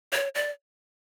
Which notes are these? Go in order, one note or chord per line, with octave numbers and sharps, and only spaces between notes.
C#5
D5